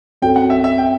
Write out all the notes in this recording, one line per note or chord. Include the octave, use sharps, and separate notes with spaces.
F#2 F#3 C4 F#4 A4 G5
F#5
E5
E5
G5